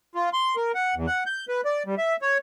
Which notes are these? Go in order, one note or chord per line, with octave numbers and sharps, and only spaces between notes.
F4
C6
A#4
F#5
E2
F#5
G6
B4
D5
G3
E5
C#5